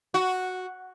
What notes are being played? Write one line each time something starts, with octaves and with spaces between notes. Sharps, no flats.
F#4